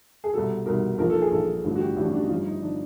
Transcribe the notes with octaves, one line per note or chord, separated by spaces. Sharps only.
G#4
C2 B2 A4
C2 B2 A#4
A#1 A#2 F3 A#4
A4
G#4
A#1 A#2 F3 A4
A1 G2 D3 F3
F#4
G4
A1 G2 D3 F3 D4
C#4
D4
D#4
G1 G2 D3 F3 F4
D#4
D3 F3 D4